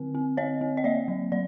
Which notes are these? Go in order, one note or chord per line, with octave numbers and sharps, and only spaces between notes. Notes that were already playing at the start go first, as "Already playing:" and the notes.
Already playing: D3 C4
C4
C4 C#5 D#5
C4
D#5
A#3 D5 E5
F#3
F#3 D5